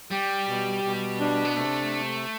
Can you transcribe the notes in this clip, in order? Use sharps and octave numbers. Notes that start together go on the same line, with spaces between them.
G3 G4
B2
B2
D4
B3
C3 A3